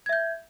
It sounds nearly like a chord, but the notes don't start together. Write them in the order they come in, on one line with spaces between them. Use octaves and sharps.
G#6 E5 G6